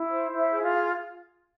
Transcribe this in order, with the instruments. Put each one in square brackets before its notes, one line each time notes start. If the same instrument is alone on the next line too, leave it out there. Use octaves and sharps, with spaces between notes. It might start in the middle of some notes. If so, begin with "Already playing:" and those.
Already playing: [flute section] E4
C5
E4
E5
G#4
F4 F5